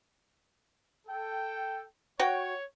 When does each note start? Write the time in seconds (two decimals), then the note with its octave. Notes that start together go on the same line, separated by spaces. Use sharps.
1.08 A4 G5
2.19 F#4 C#5 F#5 G5